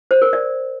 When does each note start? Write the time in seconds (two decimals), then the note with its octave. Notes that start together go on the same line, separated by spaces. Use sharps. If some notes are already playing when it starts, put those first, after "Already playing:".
0.11 C5
0.22 A#4
0.33 D5